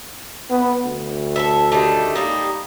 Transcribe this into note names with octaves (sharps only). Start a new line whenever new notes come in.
B3
D2
A4 B4 E5
D#3 G3 A3
G3 A#3 D#4